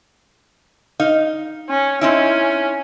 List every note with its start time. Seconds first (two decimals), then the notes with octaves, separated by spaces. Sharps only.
1.00 D#4 F5
1.70 C#4
2.01 C4 C#4 D#4 E4